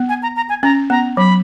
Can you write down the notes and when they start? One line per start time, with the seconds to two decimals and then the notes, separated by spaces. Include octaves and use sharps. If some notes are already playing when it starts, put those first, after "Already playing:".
Already playing: B3
0.09 G#5
0.23 A#5
0.36 A#5
0.49 G#5
0.63 C#4 A#5
0.90 B3 A#5
1.17 F#3 B5